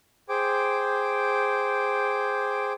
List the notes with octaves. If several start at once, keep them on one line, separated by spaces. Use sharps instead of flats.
G#4 C5 G5 D6